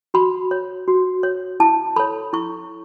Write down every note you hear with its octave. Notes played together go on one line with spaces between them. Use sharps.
F#4 B5
C#5
F#4
C#5
E4 A5
A4 C#5 B5
E4 C#6